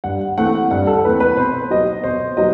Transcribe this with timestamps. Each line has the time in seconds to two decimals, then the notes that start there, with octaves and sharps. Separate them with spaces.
0.04 G2 F#5
0.38 E3 A3 C4 F#5
0.71 G2 F#5
0.87 A4
1.05 E3 A3 C4 B4
1.20 B4
1.37 B2 C5
1.70 F#3 B3 D#5
2.04 B2 C5
2.37 F#3 B3 D#5